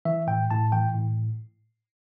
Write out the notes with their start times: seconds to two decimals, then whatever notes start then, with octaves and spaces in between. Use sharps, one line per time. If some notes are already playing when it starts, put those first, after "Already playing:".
0.05 E3 E5
0.27 A2 G5
0.51 A2 A5
0.72 E3 G5
0.95 A2